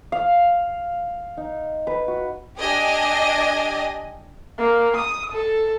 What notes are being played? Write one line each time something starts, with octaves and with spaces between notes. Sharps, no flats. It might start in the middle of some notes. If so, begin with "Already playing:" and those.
F5
D#4
B4
F#4
D4 G4 D#5 G#5
A#3
D#6
A4